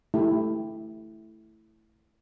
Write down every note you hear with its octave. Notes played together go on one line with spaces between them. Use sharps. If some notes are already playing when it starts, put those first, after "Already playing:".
A3 E4 G4